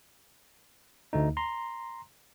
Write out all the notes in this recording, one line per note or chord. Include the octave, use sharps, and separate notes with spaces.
D2 A3 D#4
A#5 C6